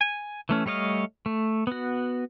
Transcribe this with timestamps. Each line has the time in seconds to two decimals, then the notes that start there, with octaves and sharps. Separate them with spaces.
0.01 G#5
0.49 E3 A3 C#4
0.66 G3 A3 C#5 D#5 F5
1.26 A3
1.67 B3 F#4